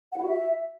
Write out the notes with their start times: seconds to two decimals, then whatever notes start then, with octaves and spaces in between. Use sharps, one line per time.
0.12 F#5
0.17 E4
0.22 F#4
0.28 E5